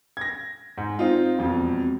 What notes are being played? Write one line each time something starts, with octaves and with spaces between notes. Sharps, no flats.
G#6 A#6
G#2
C4 D#4 F4
E1 F2